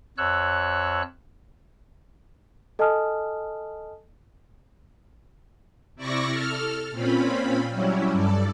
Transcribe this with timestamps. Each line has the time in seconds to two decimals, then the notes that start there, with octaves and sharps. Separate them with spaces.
0.18 F2 C#5 E6 F#6
2.79 A4 D#5 G#5 A5 D#6 F6
5.95 C3 E4 D5 C#6 A#6
6.30 A4 F6
6.91 A#2 C4 C#4 F4 B5
7.70 F#3 G3 C#4 E4
8.12 G2 A4 D5